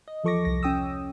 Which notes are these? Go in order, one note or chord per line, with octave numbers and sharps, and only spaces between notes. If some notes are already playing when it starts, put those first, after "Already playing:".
D#5
E2 F3 A4 C#6 D6 A#6
C2 A#6
C#4 G5 D#6 E6